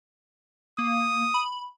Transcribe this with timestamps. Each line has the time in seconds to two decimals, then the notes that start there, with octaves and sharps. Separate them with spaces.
0.78 A#3 D#6
1.34 B5